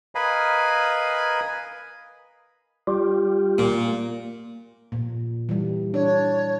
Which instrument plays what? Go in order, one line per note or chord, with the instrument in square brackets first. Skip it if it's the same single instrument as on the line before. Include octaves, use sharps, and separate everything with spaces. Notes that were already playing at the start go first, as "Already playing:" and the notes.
[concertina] A#4 B4 D#5 F5 G#5 B5
[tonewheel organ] G3 F4 G4
[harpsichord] A#2
[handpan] A#2
E3 G3
[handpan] D4 [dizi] C#5